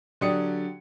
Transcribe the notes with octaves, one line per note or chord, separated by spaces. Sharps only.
D3 F#3 G4 D5 D#6 C#7